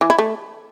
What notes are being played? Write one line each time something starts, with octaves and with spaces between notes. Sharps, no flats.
E3
E4
A3